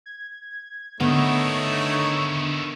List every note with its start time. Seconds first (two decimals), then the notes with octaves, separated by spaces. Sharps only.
0.06 G#6
1.00 D3 D#3 A3 B3 D#4 E4 C#5